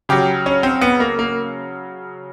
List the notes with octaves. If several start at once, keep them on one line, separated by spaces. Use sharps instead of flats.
C#3 F#3 G4
C#4
C4
B3
A#3
A#3